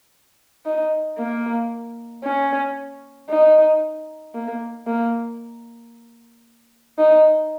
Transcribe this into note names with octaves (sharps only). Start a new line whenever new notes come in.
D#4
A#3
C#4
D#4
A#3
A#3
D#4